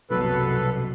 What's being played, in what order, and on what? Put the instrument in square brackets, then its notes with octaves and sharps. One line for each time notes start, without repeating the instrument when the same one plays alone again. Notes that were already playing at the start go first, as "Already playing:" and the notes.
[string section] C2 F#2 B2 [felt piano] F#3 [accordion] A4 B4